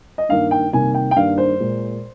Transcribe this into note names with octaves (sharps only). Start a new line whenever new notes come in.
D#5
G2 D#3 A#3 F5
G5
C3 D#3 G3 A#3 G#5
G5
G5
G2 D#3 G3 A#3 F5
C5
A#2 G#3